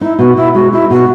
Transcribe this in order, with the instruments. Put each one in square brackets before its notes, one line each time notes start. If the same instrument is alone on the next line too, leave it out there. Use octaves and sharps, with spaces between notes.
[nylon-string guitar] D#4 [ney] E4
[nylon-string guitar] B2 [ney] F#4
[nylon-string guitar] B2 [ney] E4
[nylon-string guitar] G#3 [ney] F#4
[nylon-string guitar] D#4 [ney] E4
[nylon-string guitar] B2 [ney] F#4